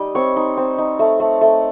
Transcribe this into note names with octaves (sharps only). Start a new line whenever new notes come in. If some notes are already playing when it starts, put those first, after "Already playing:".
Already playing: G3 D#4 D#5
C4 C#5
D#4
C4
D#4
A3
A3
A3